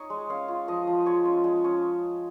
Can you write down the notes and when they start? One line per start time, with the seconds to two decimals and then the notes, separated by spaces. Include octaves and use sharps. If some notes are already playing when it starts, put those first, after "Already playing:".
Already playing: D#4 G#4 C#5 D#5
0.10 G#3
0.29 C#4 F5
0.48 F4
0.68 F3 D#5
0.87 F3
1.06 G#3 C#5
1.25 C#4
1.44 G#3
1.64 C#4